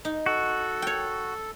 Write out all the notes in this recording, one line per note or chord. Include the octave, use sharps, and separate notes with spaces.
D#4
F#4 A4
C#5 G5